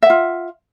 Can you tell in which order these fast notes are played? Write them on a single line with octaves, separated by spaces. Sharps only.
E5 F#5 F4